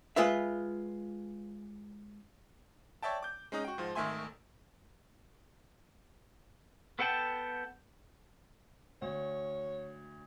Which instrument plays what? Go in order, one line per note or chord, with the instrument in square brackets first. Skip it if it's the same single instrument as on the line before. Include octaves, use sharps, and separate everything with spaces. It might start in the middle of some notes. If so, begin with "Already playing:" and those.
[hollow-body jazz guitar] G#3 F4 B4 E5
[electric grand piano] C#5 D5 E5 G5 A5
D6 G6
G#3 C#4 D#4 D#5
F#4 G5
G#2 F3
G#1 D#3 A3 E5 G#5 C6
[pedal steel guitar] B3 A4 F#5 G5 A5
[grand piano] D2 [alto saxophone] C#5